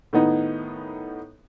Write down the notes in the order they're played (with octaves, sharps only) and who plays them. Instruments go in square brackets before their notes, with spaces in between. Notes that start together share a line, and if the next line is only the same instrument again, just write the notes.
[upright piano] A2 D#3 B3 D#4